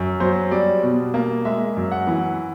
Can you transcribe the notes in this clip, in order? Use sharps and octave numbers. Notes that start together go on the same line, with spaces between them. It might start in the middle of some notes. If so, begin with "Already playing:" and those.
Already playing: F#2
F#3 C5
G3 D5
B2
A#3
G#3 E5
F#2
F#5
E3